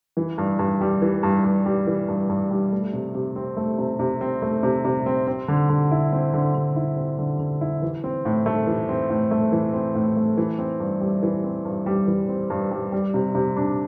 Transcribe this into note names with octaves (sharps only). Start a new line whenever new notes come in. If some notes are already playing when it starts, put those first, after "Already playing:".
E3
G2
G2
G3
E3
G2
G2
G3
E3
G2
G2
G3
A3
C3
C3
C4
A3
C3
C3
C4
A3
C3
C3
C4
C4
D3
D3
E4
C4
D3
D3
E4
C4
D3
D3
E4
E3
C4
A2
A3
E3
C4
A2
A3
E3
C4
A2
A3
E3
C4
G2
G3
E3
C4
G2
G3
E3
C4
G2
G3
G3
C3
C3
D4